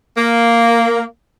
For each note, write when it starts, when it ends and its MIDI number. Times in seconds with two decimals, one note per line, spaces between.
0.17 1.03 58